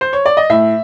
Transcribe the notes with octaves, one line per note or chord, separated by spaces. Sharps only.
C5
C#5
D5
D#5
A2 E5